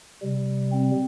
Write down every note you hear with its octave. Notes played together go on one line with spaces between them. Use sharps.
C3 G3
C4